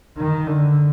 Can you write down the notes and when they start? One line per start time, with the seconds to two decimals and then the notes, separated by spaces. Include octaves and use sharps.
0.17 D#3
0.47 D3